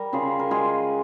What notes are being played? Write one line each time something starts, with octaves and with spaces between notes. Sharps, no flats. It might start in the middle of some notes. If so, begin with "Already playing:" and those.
Already playing: G3 A#4
C#3 F4 G#4
A#4
G#3 F4 G#4